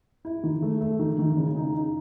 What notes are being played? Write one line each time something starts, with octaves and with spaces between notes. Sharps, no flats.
E4
D#3
A3
A3
D#3
D#3
C#3
D#4
D#4